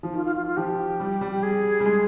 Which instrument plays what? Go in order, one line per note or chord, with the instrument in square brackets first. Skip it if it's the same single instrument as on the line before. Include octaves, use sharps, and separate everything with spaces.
[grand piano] F3
[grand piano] D#3 [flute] F4
[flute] F4
F4
F4
[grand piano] F3 [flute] G4
[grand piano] G3
G3
[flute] G4
G#4
[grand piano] G3
G#3